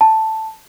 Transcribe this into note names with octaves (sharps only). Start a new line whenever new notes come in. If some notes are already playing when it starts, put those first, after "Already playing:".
A5